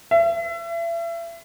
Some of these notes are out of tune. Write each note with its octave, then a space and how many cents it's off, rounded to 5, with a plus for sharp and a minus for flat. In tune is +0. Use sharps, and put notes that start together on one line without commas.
E5 +35